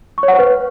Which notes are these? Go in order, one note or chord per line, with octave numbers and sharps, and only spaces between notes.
C#6
C#5
F#5
C5
B4